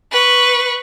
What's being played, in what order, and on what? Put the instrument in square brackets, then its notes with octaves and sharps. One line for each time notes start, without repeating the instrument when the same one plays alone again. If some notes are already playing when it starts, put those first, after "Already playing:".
[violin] B4 C#6